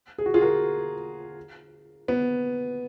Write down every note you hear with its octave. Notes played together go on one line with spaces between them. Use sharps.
G#4
F#4
F4 G#4
F#4 A#4
B3